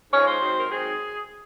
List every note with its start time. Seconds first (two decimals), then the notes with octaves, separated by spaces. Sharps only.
0.13 G#2 F3 G#3 C#5
0.27 C5
0.41 G#2 F#3 C4 D#4
0.58 A#4
0.69 G#2 F#3 C4 D#4 G#4